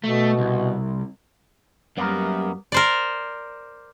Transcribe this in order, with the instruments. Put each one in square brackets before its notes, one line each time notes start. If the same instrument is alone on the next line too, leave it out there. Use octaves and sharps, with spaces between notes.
[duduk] B2 [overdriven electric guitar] A3
[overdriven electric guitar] C2
[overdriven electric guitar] F#2 [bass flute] G3 [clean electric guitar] A#3 B3 A#4
[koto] A#4 C5 D5